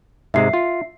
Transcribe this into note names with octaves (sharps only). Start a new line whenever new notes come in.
G#2 C3 G#3 E5 C7
F4